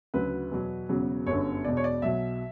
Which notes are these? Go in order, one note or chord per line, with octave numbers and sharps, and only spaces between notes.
D2 C#3 F#3 B4
E2 B2 F#3
E1 E2 C#3 F#3
G1 F#2 D3 C#5
E1 E2 B2 D5
C#5
D5
B1 B2 F#3 E5